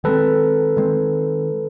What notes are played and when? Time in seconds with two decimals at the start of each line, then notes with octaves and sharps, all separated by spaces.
0.04 D#3 G#3 C4 A4 B4
0.77 D#3 G#3 C4